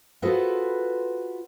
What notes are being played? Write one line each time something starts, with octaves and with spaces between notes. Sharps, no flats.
F4 F#4 G#4 A4 B4 C5